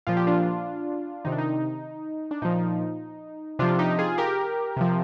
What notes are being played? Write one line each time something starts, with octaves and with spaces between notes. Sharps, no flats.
A#2 F3 F4
G4
D4 F4
C3 D#3 D#4
D4
D#4
D4
A#2 F3 D#4
C3 F3 D4 F4
D#4 G4
F4 G#4
G4 A#4
C3 F3